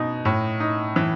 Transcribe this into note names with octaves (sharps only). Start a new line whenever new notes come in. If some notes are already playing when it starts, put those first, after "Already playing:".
Already playing: B2 D#4
A2
D#4
E3